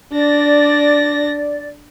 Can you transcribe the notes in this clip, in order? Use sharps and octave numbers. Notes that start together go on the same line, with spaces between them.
D4 D5 A#6